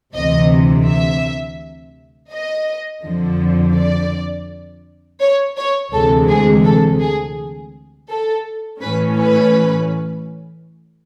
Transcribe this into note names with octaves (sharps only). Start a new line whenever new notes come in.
D2 C3 E3 D#5
E5
D#5
F2 D3 F3
D5
C#5
C#5
D2 C3 E3 G#3 A4
G#4
A4
G#4
A4
A2 E3 A3 C#4 B4
B4